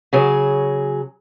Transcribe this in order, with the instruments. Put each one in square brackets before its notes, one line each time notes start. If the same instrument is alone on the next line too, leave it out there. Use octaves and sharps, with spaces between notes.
[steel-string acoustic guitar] C#3 F#3 G#4